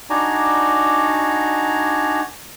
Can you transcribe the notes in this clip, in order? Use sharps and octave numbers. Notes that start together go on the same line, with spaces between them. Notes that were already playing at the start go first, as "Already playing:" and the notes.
D4 D#4 F#4 D5 G#5 A#5